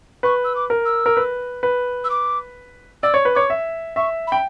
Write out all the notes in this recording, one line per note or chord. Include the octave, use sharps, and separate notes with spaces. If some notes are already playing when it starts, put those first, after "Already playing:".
B4 C#6
E6
D6
A#4
E6
A#4
B4
B4
E6
D6
D5 E6
C#5
B4
C#5 D6
E5
E5 C#6
B5
G5